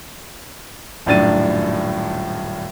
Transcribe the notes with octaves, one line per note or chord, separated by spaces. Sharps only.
D#1 F#2 A2 D4 A6 D#7